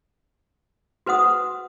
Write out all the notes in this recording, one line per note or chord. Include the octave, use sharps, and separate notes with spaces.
F#4 B4 C5 F#5 D#6